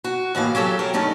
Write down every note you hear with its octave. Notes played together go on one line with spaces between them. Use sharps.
F#4
D#2 A2 E3 F5
F#3 C#4 G4 A4
G4 A#4 C#5
G2 A3 C#4 D#4